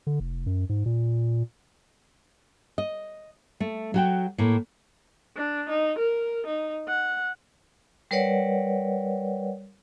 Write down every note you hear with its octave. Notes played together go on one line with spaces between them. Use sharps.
D3
F1
F#2
G#2
A#2
D#5
A3
F#3 F#4 G5
A2 A#3
D4
D#4
A#4
D#4
F#5
G3 A#4 B4 C#5 D5 F#5